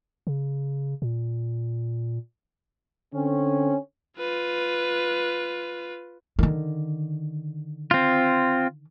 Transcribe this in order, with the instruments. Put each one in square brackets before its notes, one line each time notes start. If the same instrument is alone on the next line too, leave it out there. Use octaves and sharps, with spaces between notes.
[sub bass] C#3
A#2
[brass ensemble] D3 C4 C#4
[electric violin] F4 B4
[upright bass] D3 D#3
[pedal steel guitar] C4 F4